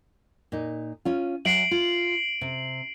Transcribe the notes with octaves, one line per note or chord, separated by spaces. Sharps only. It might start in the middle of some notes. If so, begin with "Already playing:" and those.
A#2 D#4
C#4 F4
F#3 E5 G#5 C7 D7 F#7
F4
C3